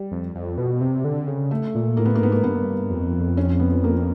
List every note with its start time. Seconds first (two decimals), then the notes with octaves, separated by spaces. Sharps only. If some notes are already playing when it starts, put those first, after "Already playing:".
Already playing: G3
0.11 F2
0.35 F2
0.58 B2
0.81 C3
1.04 D3
1.27 C#3
1.51 A3
1.75 A#2
1.97 A2 A#3
2.05 B3
2.15 A#3
2.21 G#2 B3
2.32 A#3
2.44 G2 B3
2.90 F2
3.37 C#4
3.59 B3
3.84 A#3